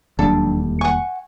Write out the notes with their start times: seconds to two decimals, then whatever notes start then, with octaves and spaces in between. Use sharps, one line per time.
0.19 E1 D#2 F#3 G3 D4 A4
0.81 F#5 G#5 C#6